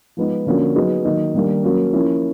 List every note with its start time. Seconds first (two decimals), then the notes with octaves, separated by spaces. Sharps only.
0.17 F3 G#3 B3 D#4
0.46 D3 F3 A#3 C#4 F#4
0.76 F#3 B3 D#4 G#4
1.05 D#3 F#3 A#3 D#4
1.34 D#3 G3 A#3 D4
1.63 F#3 A#3 C#4
1.93 F3 A#3 C#4 E4